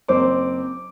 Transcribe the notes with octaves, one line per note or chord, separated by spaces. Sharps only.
F#1 C4 C5 D6